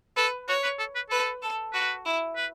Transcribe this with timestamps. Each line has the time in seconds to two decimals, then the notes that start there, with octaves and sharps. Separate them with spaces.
0.16 A4 B4
0.48 F#4 C#5
0.63 B4
0.79 A4
0.96 B4
1.10 A4 B4
1.42 A4
1.73 F#4 B4
2.05 E4
2.36 B4